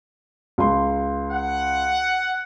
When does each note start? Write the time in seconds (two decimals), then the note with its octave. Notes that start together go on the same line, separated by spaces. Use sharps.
0.58 C#2 C6
1.30 F#5